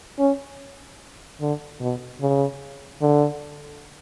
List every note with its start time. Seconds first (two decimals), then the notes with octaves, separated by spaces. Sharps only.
0.19 C#4
1.41 D3
1.80 B2
2.21 C#3
3.02 D3